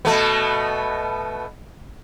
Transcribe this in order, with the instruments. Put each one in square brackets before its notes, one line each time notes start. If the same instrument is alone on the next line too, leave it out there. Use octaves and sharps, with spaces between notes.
[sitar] B2 A3 B3